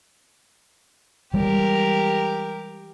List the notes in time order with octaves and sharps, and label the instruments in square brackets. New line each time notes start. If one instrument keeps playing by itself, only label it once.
[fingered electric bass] E3 G3 G#3 [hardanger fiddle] G4 A#4